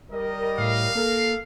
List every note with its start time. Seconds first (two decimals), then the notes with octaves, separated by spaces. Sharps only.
0.11 G3 A#4 D#5
0.58 A2 F5
0.95 A#3 A4 A#4